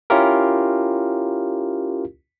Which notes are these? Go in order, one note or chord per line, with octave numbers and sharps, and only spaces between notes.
C#4 E4 F4 G4 A#4